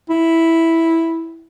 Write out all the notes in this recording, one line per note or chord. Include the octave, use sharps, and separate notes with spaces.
E4